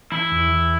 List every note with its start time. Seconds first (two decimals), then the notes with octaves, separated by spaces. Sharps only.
0.12 E3 E4
0.31 E2
0.52 E3